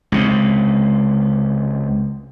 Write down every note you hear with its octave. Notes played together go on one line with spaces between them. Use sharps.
C#2 C3